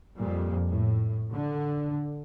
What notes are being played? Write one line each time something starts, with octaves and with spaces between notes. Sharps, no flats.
F2 A#2 G3
A2
D3